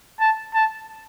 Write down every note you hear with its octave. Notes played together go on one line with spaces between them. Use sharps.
A5
A5